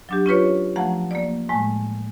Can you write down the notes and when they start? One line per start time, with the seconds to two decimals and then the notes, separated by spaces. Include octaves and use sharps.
0.09 F#3 D4 G4
0.26 C#4 F4 B4 C#5
0.76 F3 A3 F#5 A#5
1.11 A#3 D5
1.49 A2 G#3 A3